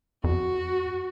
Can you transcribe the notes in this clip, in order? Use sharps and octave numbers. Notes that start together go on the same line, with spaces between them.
F2 F#4